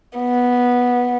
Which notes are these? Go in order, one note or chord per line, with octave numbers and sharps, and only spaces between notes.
B3